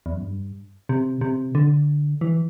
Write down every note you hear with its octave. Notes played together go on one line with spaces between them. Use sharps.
E2
F#2
G2
C3
C3
D3
E3